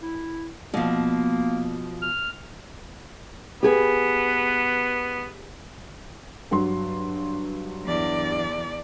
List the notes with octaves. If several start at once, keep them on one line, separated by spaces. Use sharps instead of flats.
E4
B2 F3 A#3
F6
B3 G4 G#4 B4
G2 F#3 C6
E2 D5